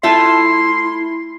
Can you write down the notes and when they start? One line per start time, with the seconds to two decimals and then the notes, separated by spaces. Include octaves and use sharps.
0.03 A3 E4 F4 E5 C6